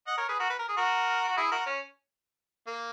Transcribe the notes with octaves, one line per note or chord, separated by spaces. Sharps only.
D#5 F#5
A#4 C#5
G#4 B4
F#4 A#4
B4
A#4
G#4
F#4 A#4
F#4
E4 G#4
F#4 A#4
C#4
A#3